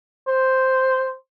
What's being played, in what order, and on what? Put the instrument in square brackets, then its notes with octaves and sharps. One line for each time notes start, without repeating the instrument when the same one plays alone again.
[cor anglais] C5